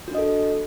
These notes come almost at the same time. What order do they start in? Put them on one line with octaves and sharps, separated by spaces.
F#4 D4 D#5 A4